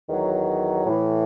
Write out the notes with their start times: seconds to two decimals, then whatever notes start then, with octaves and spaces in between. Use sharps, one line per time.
0.09 E2 D#3 F#3
0.86 A2 E3